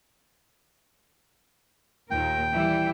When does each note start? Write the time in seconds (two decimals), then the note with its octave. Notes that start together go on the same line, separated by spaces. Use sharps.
2.11 D#2 A#2 A#4 G5
2.54 E3 G3 E4